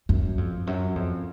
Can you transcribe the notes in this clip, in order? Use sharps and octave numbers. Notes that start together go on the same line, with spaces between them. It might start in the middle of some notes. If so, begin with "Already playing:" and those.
F#2
F2
F#2
F2